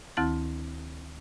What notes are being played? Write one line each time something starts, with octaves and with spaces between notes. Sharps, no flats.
D2 D#3 C4 E4 A5 A6